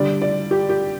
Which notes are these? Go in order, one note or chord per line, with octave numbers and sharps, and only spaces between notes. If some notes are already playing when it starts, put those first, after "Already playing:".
Already playing: D3 G3 D5
D5
G4
G4